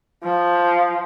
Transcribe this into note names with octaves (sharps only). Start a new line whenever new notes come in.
F3